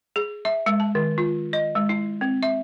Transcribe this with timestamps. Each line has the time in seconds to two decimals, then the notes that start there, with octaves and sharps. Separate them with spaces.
0.16 G#4
0.45 E5
0.66 G#3
0.80 A5
0.95 D#3
1.18 F4
1.53 D#5
1.75 G#3
1.89 E4
2.21 C4
2.43 E5